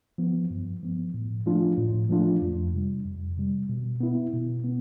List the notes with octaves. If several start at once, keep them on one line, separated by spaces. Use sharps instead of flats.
F3 B3
G2
F3 B3
A2
F3 A3 D4 F4
A2
F3 A3 D4 F4
F2
C3 G3
F2
C3 G3
B2
B3 E4
B2
B3